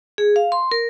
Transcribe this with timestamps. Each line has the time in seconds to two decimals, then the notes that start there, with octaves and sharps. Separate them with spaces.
0.18 G#4
0.36 F5
0.52 C6
0.71 A#4